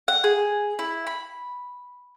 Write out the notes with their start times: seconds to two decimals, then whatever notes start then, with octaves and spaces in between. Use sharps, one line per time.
0.08 F#5
0.24 G#4
0.79 E4
1.07 B5